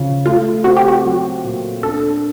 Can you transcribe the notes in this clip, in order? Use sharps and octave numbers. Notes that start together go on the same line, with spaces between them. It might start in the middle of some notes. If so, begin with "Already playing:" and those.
Already playing: C#3 F3
A3 F4
C4 F#4
G4
F#4
F#3
A#2
D4 A4